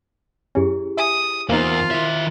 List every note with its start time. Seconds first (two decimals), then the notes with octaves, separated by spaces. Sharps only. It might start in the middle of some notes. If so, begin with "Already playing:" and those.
0.55 F#2 C#4 E4 G4 G#4
0.97 E5 G#5 D#6 C#7
1.49 E2 A#3 D#4 F4 A#4 C5 A#5
1.91 D#3 E4 E5 C6